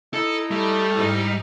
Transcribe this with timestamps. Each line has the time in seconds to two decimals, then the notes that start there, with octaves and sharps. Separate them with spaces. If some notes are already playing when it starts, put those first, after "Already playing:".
0.14 D#4 E4 A4
0.51 G3 A3
0.94 G#2 D#4 E4